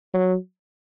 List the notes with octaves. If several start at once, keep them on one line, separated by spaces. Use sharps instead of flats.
F#3